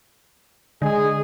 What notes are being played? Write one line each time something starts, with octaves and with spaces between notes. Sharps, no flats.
D3 G#3 G#4